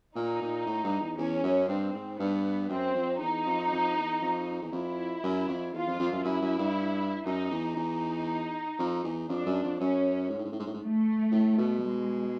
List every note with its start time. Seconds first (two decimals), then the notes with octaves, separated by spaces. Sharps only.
0.16 A#2 D#4
0.42 A#2
0.67 A2
0.84 G2
1.00 E2
1.17 E2 C#4
1.43 F#2
1.68 G2 C4
1.93 G#2
2.19 G2 B3
2.69 F#2 C4
2.95 F2
3.20 E2 D#4
3.46 F2
3.72 F2
3.97 E2
4.22 F2
4.62 E2
4.72 F2 E4
5.23 F#2
5.49 F2
5.73 E2 F4
5.87 F2
5.99 F2
6.12 F#2
6.24 F#2 E4
6.41 F#2
6.58 G2
7.26 F#2 D#4
7.51 E2
7.76 E2 D#4
8.79 F2
9.04 E2
9.28 F2 D4
9.46 F#2
9.63 F2
9.79 F#2 C#4
10.30 G#2
10.38 A2
10.45 G#2
10.52 A2
10.60 G#2
10.67 A2
10.74 G#2
10.82 A3
11.31 A2
11.58 B2
11.83 G#3